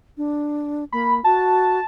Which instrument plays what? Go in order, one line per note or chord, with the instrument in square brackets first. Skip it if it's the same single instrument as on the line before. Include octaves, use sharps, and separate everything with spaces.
[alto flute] D4
[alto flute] A#3 [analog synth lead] B5
[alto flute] F#4 [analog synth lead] A5